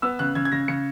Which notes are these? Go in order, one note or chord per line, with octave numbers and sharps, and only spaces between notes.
B3 E6
C#3 F#6
C#3 G#6
G#6
C#3 A#6
C#3 C#7